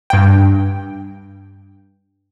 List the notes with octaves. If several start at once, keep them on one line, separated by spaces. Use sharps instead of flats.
G2 G5